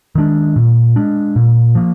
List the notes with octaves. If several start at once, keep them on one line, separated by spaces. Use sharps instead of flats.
D#3 G#3 D4
A#2
G#3 D4
A#2
F3 A#3